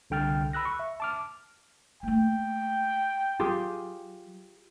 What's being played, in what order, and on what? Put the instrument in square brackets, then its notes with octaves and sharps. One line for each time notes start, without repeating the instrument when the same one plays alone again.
[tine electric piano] C2 D3 G5 F6 A6
B5 E6 F#6 A#6
C#6
E5
A5 D6 F6
[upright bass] A3 A#3 [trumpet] G5
[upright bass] F#3 [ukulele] F4 G4 G#4